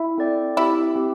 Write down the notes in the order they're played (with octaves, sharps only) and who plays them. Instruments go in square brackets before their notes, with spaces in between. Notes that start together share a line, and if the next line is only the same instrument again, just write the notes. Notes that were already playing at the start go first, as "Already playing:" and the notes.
Already playing: [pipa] E4
[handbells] C4 A4 D5 G5
[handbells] C4 G4 E5 [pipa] E4
[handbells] C4 G4